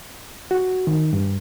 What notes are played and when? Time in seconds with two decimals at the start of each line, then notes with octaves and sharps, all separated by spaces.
0.51 F#4
0.87 D#3
1.13 G2